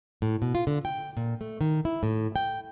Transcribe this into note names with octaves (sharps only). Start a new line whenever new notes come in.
A2
B2
F4
D3
G5
A#2
A3
D#3
E4
A2
G5